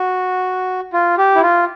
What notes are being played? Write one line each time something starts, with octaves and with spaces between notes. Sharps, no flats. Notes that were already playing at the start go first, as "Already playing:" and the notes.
Already playing: F#4
F4
G4
E4
F4